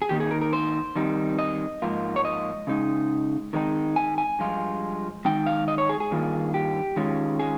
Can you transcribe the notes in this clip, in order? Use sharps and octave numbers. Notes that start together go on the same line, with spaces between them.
G#4
D#3 A#3 D#4 G4
G#4
A#4
A#4
C5
D#3 G3 C4 D#4
D#5
G#2 F3 A#3 F4
C#5
D#5
C#3 G#3 D#4
D#3 G#3 C4 D#4
G#5
G#5
G2 F3 G#3 F4
D#3 G#3 D#4 G5
F5
D#5
C#5
G#4
G#4
G2 D#3 A#3 F4
G4
D#3 G#3 C#4 F4
G#4